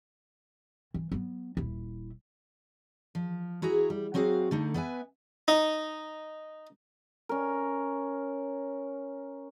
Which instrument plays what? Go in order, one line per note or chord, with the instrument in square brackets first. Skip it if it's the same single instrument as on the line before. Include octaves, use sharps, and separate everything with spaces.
[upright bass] E3
F#3 B3
D#1 E4
[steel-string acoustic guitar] F3
E4 F#4 G#4 A#5
G3
F#3 C4 F#4 G#4 F5
D3 A3 D#4
B3 B4 E5 G#5
[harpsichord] D#4
[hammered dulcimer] C#4 A#4